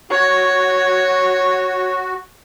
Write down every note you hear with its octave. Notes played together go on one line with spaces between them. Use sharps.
F#4 C#5